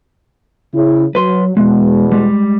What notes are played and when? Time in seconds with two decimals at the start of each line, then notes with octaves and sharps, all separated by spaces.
0.74 C#3 E4
1.15 F#3 B4 C6
1.57 E2 B2 G#3
2.12 G3 G#3